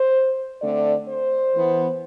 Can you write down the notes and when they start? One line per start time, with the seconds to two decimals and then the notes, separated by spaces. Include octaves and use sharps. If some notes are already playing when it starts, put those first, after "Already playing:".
Already playing: C5
0.62 D3 A3 C4 D5
1.07 C5
1.54 E3 B3